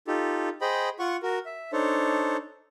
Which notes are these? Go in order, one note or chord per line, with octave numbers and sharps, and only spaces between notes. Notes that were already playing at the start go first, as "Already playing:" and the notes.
D#4 F4 G4 A4
G#4 C5 D#5 G5 B5
F4 F#5 C#6
F#4 A#4
E5
D4 D#4 A4 C5 C#5